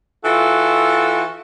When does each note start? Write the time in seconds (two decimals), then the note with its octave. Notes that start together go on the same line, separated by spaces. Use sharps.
0.25 E3 F4 F#4 A4